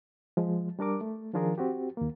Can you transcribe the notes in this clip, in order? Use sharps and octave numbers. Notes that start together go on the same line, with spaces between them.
F3 G#3
G3 D4 A#4 D6
A3
D#3 F3 D4 F4 G#4 A#4
C4 F#4 G4
D#2 A#3